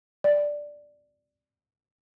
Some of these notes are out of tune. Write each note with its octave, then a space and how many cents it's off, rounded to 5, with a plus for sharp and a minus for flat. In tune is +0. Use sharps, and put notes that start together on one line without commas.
D5 +0 G5 +0